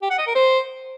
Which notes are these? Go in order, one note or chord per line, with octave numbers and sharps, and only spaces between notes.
G4
F#5
D#5
A#4
C5